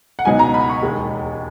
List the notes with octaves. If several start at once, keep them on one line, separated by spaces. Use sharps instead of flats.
F#5
C#2 B2 F#3 B3 D#4 G#5
A#5
B5
C#6
E1 D#2 D#3 G#3